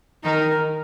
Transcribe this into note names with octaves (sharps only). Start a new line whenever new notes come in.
D#3 D#4 A#4